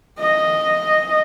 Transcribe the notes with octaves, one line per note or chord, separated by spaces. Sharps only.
D#5